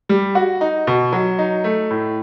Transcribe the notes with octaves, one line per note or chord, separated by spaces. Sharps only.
G3
F#4
D#4
B2
F#3
D#4
A3
A2